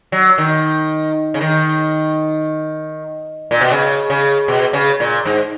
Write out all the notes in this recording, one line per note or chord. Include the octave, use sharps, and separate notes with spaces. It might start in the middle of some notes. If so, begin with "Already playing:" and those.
F#3
D#3
C#3
D#3
A#2
B2
C#3
C#3
B2
C#3
A#2
G#2